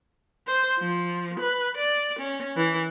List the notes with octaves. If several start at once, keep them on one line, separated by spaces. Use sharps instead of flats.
C5
F3
B4
D5
C#4
E3